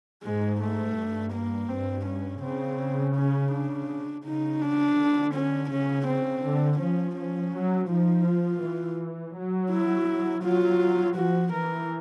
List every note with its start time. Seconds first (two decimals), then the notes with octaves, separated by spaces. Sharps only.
0.23 G#2 G#3
0.61 A3
0.96 G2
1.33 A#3
1.69 G2 C4
2.06 C#4
2.42 C#3 C4
3.15 C#4
3.52 D4
4.24 C#3 D#4
4.61 D4
4.97 D3
5.34 C#4
5.70 C#3 C#4
6.07 C4
6.44 D3
6.79 F3 C#4
7.16 C#4
7.53 F#3
7.89 F3 D#4
8.25 F4
8.62 E3
9.35 F#3
9.72 E4
10.44 F#3 F4
11.17 F3 F#4
11.53 E3 A#4